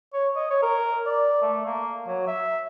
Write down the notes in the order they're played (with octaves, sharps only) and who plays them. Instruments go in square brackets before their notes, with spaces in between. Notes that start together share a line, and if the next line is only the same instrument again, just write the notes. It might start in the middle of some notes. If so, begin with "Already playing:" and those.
[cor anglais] C#5
D#5
C#5
A#4
D5
A3
A#3
F#3
E5